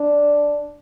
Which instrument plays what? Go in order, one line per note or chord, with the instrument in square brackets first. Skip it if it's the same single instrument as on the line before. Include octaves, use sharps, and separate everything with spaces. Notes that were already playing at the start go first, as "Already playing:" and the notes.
Already playing: [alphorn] D4